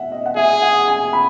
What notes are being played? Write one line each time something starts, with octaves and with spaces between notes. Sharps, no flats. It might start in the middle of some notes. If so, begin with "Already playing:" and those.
Already playing: E5 F#5
D#5
F#5
G#4 E5
F#5
G#5
B5